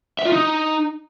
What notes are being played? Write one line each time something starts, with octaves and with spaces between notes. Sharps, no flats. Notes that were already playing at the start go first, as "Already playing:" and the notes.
E5
F4
D#4